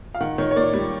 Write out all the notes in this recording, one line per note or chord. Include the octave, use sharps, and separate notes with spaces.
F5
D#3 F#5
D#3 C#5
C#5
A#3 D5
G3